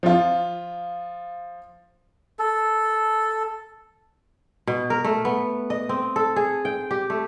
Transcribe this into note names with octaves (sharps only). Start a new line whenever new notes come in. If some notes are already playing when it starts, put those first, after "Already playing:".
F3 F4
A4
B2
A#4
A3
B3
D#5
C4
A4
G#4
G5
G4
A3